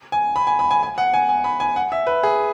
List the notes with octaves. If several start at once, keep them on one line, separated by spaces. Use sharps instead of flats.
G#5
B5
G#5
B5
G#5
G#5
F#5
G#5
G#5
B5
G#5
F#5
E5
B4
G#4